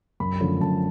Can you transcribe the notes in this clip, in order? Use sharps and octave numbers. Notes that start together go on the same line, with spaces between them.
F#2 B5
D3 F3 A3 C#4
F#2 A5